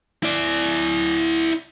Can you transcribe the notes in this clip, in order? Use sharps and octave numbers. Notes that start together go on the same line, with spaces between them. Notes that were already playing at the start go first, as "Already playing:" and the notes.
E4 D5